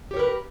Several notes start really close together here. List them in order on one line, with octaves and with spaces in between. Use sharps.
G4 C#5 A#4 B4